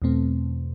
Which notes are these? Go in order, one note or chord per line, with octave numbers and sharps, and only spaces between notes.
E2 B2 A3 C4